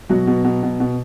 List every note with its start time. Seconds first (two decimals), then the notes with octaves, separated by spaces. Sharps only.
0.09 B2 F#3 F#4
0.27 B2
0.44 B2
0.63 B2
0.80 B2